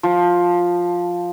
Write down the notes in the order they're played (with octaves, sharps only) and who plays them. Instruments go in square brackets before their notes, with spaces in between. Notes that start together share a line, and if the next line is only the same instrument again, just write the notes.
[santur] F3